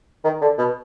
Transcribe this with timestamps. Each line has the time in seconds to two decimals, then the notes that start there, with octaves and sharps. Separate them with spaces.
0.24 D#3
0.41 D3
0.58 B2